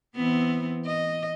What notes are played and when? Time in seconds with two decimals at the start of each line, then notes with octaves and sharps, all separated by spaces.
0.16 E3 B3 C4
0.86 D#5